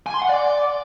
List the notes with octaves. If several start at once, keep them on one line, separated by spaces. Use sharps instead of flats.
G#5
C6
F#5
D5